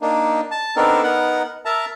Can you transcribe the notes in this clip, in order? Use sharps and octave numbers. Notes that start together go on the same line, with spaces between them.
A#3 D4 D#4
A5
B3 C4 D4 D#4 A4 A#4
B3 D#4 A#4 F#5
A#4 E5 A5 A#5